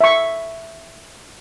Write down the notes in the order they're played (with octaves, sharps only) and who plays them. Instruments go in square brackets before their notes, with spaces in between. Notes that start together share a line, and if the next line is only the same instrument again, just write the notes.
[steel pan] E5 C#6